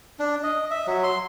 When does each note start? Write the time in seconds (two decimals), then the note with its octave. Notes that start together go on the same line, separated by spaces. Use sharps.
0.19 D4
0.43 D#5
0.71 E5
0.86 F#3
1.04 C6